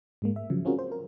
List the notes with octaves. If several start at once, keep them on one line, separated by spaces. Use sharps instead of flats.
G#2 G#3 A#3
E5
C#3 F3 F#3
C4 C#4 F4 F#4 G#4 A#4
C5
A#4